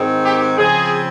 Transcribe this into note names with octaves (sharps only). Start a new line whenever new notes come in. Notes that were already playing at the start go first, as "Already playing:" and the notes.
Already playing: G#2 D#3 G#3 C4
G4
C#3 F3 C4 G#4